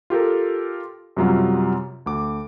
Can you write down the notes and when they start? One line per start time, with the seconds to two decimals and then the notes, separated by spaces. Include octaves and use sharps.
0.10 F4 G4 A4 A#4
1.17 F#2 C3 F#3 G3 F4
2.06 D2 D6